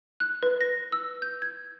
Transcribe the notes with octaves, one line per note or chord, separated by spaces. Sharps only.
F#6
B4
A#6
E6
G6
G#6